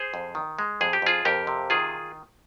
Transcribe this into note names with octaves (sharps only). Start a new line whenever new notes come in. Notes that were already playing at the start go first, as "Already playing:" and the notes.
Already playing: G#4 C5
F2
D#3
G#3
F2 G#4
G4
F2 F4 G#4
F2 G4 A#4
C3
D#3 F4 G#4